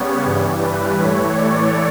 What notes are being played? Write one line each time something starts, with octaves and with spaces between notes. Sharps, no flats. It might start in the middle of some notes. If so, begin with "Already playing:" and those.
Already playing: C#3 G3 B3 C#5
G2 E3 G3
B4
A2 E3 A3 C#5
D5